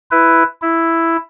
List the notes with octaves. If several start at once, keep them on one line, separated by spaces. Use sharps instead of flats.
E4 B4
E4